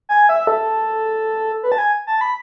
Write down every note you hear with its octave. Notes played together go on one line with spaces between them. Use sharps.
G#5
E5
A4
B4
A5
G#5
A5
B5